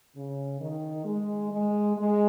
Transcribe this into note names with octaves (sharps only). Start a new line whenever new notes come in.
C#3
D#3
G#3
G#3
G#3